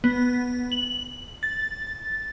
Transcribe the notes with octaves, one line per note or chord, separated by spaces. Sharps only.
B3
F#7
A6